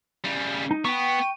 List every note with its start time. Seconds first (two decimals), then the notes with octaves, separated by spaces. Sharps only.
0.25 C#3 G3
0.71 D#4
0.85 B3 G5 C#6